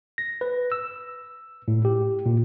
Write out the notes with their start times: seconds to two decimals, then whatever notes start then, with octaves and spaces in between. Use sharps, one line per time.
0.18 A#6
0.41 B4
0.72 E6
1.68 A2
1.85 G4
2.26 A#2